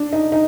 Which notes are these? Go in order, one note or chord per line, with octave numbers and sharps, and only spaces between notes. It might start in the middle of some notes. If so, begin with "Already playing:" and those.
Already playing: D4
D#4
D#4